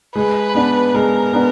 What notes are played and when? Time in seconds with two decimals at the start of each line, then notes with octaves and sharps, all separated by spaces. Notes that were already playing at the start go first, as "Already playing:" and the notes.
0.16 G#3 B4
0.55 B3 D4
0.94 G#3 A#4
1.33 B3 D4